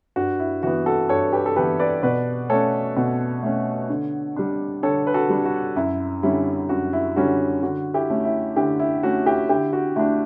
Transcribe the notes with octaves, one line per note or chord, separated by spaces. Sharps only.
G2 F#4
E4
E3 B3 F#4
F#4 A4
G2 A4 C#5
G4 B4
A4
E3 B3 G4 B4
B4 D5
B2 B4 D5
A3 C#4 A4 C#5
B2
A3 C#4
D3
G3 D4
D3 A4 C#5
B4
F#4 A4
G3 D4
F#4
F#2 E4
D3 G3 C#4 E4
F#2 F#4
E4
D3 G3 C#4 F#4
D3 F#4
E4 G4
A3 C#4
E4
D3 E4 G4
E4
A3 C#4 F#4
E4 G4
D3 E4 G4
F#4
A3 D4 E4